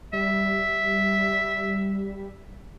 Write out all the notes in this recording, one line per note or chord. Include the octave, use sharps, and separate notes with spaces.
G3 E5